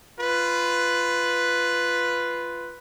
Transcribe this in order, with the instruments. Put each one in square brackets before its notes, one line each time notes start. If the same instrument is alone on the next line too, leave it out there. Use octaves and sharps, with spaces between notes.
[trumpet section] F4 B4